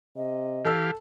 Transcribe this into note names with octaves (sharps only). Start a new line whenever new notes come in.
C3 D#5
E3 G4 A4 F5 A5 E6